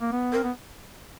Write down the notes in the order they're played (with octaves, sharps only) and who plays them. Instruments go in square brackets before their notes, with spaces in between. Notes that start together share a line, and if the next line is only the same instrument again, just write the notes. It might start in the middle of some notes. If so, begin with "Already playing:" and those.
[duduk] A#3
B3
[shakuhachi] A#4
[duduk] C4
B3